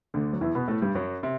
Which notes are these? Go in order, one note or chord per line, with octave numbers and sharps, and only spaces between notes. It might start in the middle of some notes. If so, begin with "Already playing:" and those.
D2 D3
F#3
E2 E3
B2 B3
A2 A3
G2 G3
F#2 F#3
C3